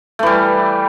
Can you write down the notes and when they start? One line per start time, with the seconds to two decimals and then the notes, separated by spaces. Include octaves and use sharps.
0.19 A3
0.23 E3
0.26 G3